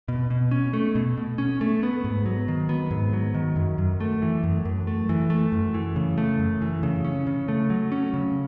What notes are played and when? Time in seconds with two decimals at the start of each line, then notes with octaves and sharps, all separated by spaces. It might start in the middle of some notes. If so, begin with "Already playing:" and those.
0.08 B2
0.30 B2
0.51 C#4
0.73 A3
0.95 B2
1.17 B2
1.38 C#4
1.61 A3
1.83 B3
2.04 G#2
2.26 F#3
2.48 D#3
2.69 B3
2.91 G#2
3.13 F#3
3.34 D#3
3.56 F#2
3.78 F#2
4.01 A3
4.22 E3
4.44 F#2
4.65 F#2
4.87 A3
5.09 E3
5.30 A3
5.52 F#2
5.74 E3
5.96 C#3
6.18 A3
6.39 F#2
6.62 E3
6.83 C#3
7.04 C#4
7.27 C#3
7.48 A3
7.70 F#3
7.92 C#4
8.14 C#3